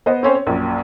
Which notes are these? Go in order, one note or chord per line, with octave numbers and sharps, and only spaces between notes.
B3 C5 D#5
C4 C#4 C5
C#5
A#1 F#2 A#2